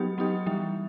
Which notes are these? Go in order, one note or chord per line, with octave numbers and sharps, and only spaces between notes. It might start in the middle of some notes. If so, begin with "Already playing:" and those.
Already playing: F#3 B3 D#4 G4
F#3 B3 D#4 G4
E3 G3 D#4